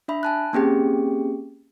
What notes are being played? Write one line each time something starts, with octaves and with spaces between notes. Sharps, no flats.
D4 E5 B5
G#5 A5 F#6
A#3 C4 C#4 G4 G#4 G5